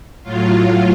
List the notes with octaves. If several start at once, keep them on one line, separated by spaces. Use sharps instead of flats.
A2 F#3 F4